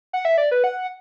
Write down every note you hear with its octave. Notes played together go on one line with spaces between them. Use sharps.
F#5
E5
D5
B4
F#5